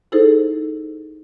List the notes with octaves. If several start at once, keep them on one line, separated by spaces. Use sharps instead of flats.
D#4 E4 G#4 A4 C5